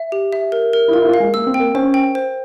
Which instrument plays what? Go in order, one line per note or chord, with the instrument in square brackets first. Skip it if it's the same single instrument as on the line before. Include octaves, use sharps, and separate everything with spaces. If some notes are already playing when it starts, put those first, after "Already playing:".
Already playing: [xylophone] E5
G4
E5
A#4
A#4
[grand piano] E4
[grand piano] F4 [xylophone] A#4
[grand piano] E4
F4
[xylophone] F5
[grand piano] G#3
[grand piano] A#3 [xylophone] E6
[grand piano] C4
[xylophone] G5
[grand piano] A#3
[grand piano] C#4 [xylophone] C5
[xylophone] G5
C5